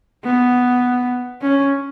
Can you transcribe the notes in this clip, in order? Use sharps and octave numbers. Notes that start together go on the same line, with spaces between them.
B3
C#4